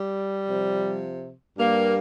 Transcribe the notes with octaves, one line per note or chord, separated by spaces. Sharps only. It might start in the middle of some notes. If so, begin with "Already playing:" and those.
Already playing: G3
C3 F3
G2 G3 A#3